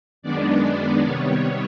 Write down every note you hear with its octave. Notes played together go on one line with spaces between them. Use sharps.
F#2 D#3 G#3 B3 D4 D5
C3 D#3 G3 B3 C#5